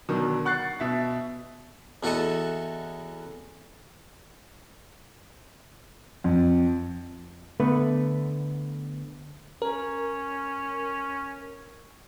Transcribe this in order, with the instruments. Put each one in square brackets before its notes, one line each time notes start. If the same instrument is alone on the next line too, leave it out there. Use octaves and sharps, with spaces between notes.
[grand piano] B2 D3 D#3 F#3
F#5 C#6 F#6 A6 C7
B2 E5 A6
[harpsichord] E2 E4 F#4 A4 D#5 A5
[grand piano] F2
[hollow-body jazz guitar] D3 A3 B3 B4
[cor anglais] C#4 [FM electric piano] A#4